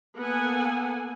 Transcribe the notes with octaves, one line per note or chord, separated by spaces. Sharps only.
A#3 B3 A4 F#5 G#5